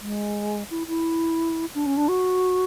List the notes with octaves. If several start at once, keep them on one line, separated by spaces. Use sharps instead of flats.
G#3
E4
E4
D4
C#4
D4
F#4